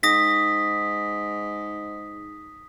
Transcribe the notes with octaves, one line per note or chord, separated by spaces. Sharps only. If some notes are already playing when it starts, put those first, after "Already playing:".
G#2 D#6 A#6 B6